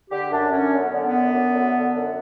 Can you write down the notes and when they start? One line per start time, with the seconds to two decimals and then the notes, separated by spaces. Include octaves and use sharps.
0.10 D3 G4
0.31 F#2 D4
0.52 F#2 C#4
0.73 D3
0.78 B3
0.93 D3
1.06 B3
1.13 F#2
1.33 F#2
1.53 D3
1.74 D3
1.94 F#2